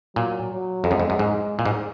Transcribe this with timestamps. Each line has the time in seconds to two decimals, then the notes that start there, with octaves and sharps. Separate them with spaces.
0.15 A#2 F#3
0.53 F#3
0.84 F2
0.91 F#2 G#3
1.00 F2
1.10 F#2
1.19 G#2
1.59 A#2
1.65 G#2